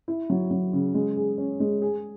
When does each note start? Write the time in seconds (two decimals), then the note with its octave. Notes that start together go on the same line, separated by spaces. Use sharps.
0.08 E4
0.30 F#3
0.51 F#3
0.73 C#3
0.94 G#3
1.16 G#4
1.38 C#4
1.60 G#3
1.82 G#4